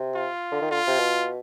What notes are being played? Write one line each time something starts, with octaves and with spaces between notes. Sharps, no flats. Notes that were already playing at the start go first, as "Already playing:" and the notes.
Already playing: C3
F4
D3
D#3
D3 F4
C3
B2